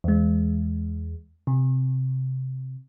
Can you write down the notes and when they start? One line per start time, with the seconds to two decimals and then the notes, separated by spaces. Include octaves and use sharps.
0.04 E2 G#3
1.47 C3